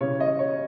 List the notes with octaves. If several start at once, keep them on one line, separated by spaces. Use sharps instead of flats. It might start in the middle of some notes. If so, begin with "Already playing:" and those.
C#3 E3 G3 C#4 C#5
D#5
C#5